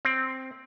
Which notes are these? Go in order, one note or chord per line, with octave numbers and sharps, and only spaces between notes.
C4